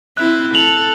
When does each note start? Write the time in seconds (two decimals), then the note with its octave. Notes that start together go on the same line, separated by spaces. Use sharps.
0.17 C4 E4 F#6
0.55 A4 F7 F#7